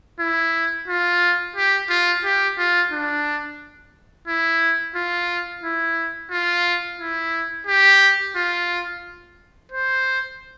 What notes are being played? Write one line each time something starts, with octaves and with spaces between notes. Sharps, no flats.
E4
F4
G4
F4
G4
F4
D4
E4
F4
E4
F4
E4
G4
F4
C5